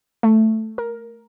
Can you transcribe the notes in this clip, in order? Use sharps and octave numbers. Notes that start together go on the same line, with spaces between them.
A3
A#4